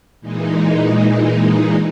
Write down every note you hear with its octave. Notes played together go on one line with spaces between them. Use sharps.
A#2 E3 G#3 D#4